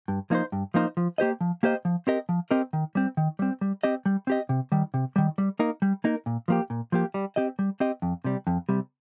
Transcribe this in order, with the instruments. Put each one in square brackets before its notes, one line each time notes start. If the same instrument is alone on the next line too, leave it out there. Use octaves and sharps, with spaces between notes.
[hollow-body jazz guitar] G2
F3 A#3 D#4 C5
G2
F3 A#3 D#4 C5
F3
A#3 G4 C5 D#5
F3
A#3 G4 C5 D#5
F3
C4 G4 A#4 D#5
F3
C4 G4 A#4 D#5
D#3
G3 C4
D#3
G3 C4
G3
C4 G4 D#5
G3
C4 G4 D#5
C3
D#3 G3
C3
D#3 G3
G3
A#3 D#4 A#4
G3
A#3 D#4 A#4
A#2
F3 A#3 G4
A#2
F3 A#3 G4
G3
C4 G4 D#5
G3
C4 G4 D#5
F2
C3 G3
F2
C3 G3